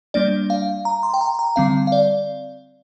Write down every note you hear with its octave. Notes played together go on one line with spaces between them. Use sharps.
G3 A#3 D4 D5
F5
A#5
C6
G5
A#5
A#5
D3 G3 C4 F5
F5
D5